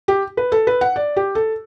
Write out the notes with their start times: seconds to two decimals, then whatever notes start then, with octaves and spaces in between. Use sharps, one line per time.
0.08 G4
0.37 B4
0.52 A4
0.67 B4
0.81 F#5
0.96 D5
1.16 G4
1.35 A4